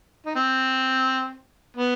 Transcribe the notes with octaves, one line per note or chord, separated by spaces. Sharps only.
D#4
C4
B3